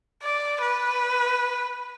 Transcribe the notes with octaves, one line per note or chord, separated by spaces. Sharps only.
D5
B4